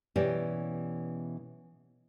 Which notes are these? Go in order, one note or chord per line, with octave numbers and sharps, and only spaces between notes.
B2 E3 C#4 G4 D5